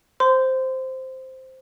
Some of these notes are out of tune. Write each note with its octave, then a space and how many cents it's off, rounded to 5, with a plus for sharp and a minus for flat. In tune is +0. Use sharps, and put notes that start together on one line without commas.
C5 +0 C6 -30